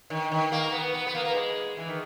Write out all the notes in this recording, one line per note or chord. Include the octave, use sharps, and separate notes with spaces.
D#3
D#3
A#3
B3
B3
B3
A#3
A#3
G#3
E3
D#3